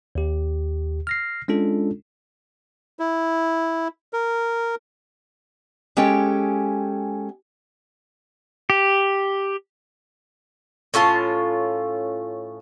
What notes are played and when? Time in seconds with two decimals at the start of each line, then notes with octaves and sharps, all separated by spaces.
0.15 D#2 G4
1.07 F6 A#6 C7
1.48 G#3 C#4 D4 F4 A4
2.99 E4
4.13 A#4
5.97 G#3 C#4 G4 A4 G5
8.70 G4
10.94 A2 C#4 F4 A5